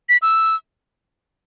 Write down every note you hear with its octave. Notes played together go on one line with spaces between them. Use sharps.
B6
E6